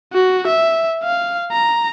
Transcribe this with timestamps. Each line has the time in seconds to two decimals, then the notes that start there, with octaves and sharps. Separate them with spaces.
0.13 F#4
0.47 E5
1.04 F5
1.52 A#5